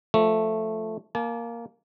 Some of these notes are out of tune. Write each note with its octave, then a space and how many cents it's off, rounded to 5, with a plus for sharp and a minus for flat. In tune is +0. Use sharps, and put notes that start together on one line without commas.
F3 +0 A3 +0
A#3 +0 A5 -45